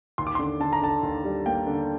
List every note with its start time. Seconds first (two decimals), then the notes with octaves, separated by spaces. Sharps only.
0.18 D#2 C6
0.27 D6
0.35 C6
0.39 D3
0.60 D3 A5
0.73 A#5
0.82 D3 A5
1.03 D#2
1.25 G3
1.46 A#3 G5
1.67 D3